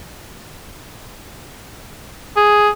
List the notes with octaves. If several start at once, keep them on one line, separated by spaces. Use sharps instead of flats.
G#4